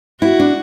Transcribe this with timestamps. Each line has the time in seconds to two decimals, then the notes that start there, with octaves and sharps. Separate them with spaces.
0.22 E4 F#4
0.40 D4